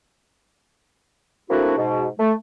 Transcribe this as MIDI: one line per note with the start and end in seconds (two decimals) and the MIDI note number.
1.50 1.74 57
1.50 1.74 58
1.50 1.74 60
1.50 1.74 62
1.50 1.74 64
1.50 1.74 66
1.77 2.08 44
1.77 2.08 47
2.19 2.33 57